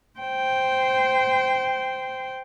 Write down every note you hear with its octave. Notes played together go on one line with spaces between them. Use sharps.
C5 G5